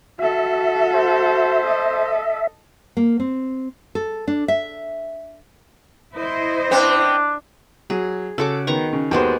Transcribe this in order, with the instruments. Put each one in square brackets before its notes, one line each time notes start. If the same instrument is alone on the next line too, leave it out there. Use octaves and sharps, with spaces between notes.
[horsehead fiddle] F#4 A4 [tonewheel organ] E5
[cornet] C5
[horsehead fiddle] A4 D#5
[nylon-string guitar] A#3
C4
A4
D4
E5
[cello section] E4 C5 D#5
[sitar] B3 C4 [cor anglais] D4
[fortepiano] F#3 [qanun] G#4
[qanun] C#3 F#4 D6 [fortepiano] A4
[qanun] D#3 A#5 C#6 [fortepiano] B3
[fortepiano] C#3
[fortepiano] D#2 F#4 C5 [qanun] G#3 B3 G4